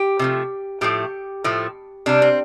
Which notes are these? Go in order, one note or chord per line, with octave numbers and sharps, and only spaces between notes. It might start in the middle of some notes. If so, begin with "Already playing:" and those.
Already playing: G4
C3 F3 A3
A2 F3 A3 G4
A2 F3 A3
C3 G3 D4
C4